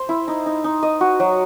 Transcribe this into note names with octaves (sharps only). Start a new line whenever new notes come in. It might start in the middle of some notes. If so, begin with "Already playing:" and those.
Already playing: C5
E4
D#4
D#4
D#4
D#5
F#4
F#3